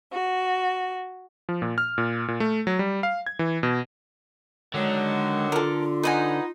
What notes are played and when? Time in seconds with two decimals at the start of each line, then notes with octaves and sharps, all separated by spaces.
0.12 F#4
1.49 F3
1.62 A#2
1.78 F6
1.98 A#2
2.28 A#2
2.40 A3
2.67 F#3
2.79 G3
3.03 F5
3.26 G#6
3.39 E3
3.63 B2
4.74 D3 D#3 F#3 G#3
5.52 F4 A4 A#4
6.03 D#4 B4 F#5 G#5